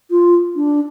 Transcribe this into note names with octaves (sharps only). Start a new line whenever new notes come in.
F4
D4